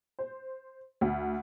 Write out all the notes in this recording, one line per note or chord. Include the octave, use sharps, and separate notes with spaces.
C5
D2